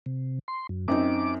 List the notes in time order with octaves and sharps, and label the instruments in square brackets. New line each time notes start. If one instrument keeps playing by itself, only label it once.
[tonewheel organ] C3
C6
F#2
[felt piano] F#2 C4 D#4 [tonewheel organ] D6